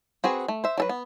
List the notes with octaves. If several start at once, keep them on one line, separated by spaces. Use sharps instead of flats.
C4 F#4 G#4 B4
A3
C5 E5
F#3 A4 B4
B3